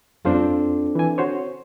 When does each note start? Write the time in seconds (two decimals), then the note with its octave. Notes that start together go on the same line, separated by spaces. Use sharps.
0.25 F2 C4 D4 F4 A4 C5
0.95 E3 G#5
1.18 F#4 C5 C#5